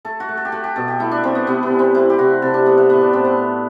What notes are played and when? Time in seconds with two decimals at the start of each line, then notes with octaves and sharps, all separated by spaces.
0.05 A3 A4
0.20 F#4
0.29 A3
0.37 A4
0.45 G4
0.52 A3 F#4
0.64 G4
0.76 B2 A4
0.88 G4
1.00 A3 E4
1.11 D4
1.24 A3 C4
1.35 B3
1.47 C3 B3
1.63 B3
1.71 E3
1.79 C4
1.94 A3 E4
2.10 G4
2.19 C3 F#4
2.42 C3 A4
2.54 D4
2.66 A3 B3
2.78 A3
2.90 A2 B3
3.01 D4
3.13 A2 C4
3.25 B3
3.37 A3